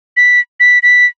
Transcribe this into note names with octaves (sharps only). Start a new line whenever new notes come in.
B6
B6
B6